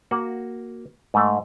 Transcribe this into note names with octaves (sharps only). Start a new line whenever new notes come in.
A#3 F#4 F#5
G#2 A3